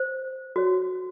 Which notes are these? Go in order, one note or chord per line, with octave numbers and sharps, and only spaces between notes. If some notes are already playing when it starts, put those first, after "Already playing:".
Already playing: C5
F#4 C#5